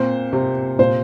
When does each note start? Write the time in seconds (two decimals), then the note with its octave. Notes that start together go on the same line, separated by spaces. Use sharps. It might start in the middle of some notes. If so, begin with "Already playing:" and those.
Already playing: A#2 C4 C5
0.33 C3
0.79 A#2 C5